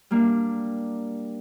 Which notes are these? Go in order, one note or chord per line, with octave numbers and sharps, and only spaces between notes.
G3 A#3 D4